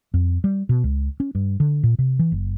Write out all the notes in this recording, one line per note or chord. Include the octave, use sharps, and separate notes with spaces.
F2
G3
B2
C#2
C#4
G2
D3
A#2
C3
E3
F#1